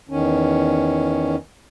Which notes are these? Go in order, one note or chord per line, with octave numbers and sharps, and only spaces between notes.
E2 D#3 C#4